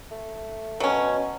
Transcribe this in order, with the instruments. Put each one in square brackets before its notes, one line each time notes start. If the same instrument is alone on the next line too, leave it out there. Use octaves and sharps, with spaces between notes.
[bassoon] A3
[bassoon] B2 [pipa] F#3 C#4